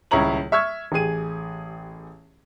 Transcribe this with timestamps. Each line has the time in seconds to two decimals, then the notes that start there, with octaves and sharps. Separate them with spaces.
0.11 D#1 C#2 E4 C#5 A#5 F#7
0.52 E5 C#6 E6 F6 G#6
0.92 A1 G4 G#4 D#7